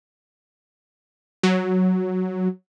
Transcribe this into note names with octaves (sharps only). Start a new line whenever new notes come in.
F#3